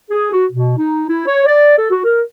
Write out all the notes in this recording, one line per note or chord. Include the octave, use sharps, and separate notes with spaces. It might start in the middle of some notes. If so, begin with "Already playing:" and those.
G#4
F#4
B2
D#4
E4
C#5
D5
A4
F#4
A#4